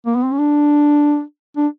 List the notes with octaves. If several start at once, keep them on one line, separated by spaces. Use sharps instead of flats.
A#3
B3
C4
C#4
D4
D4